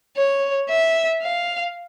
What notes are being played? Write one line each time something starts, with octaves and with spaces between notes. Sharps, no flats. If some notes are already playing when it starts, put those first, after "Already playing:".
C#5
E5
F5